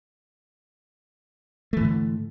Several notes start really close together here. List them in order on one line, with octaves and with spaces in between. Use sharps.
A3 E3 G#2 D3